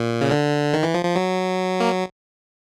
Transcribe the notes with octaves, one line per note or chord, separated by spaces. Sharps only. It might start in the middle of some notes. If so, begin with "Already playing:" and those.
Already playing: A#2
C#3
D3
D#3
E3
F3
F3
F#3
A#3